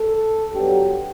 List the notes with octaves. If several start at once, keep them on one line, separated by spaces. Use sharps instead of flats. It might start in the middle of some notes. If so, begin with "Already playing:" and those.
Already playing: A4
G2 F#3 B3 G4